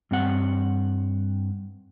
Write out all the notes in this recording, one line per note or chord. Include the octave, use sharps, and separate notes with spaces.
G2 C4 F#5